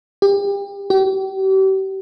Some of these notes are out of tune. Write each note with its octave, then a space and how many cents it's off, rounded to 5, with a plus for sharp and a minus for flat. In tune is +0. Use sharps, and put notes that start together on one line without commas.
G4 +30
G4 -40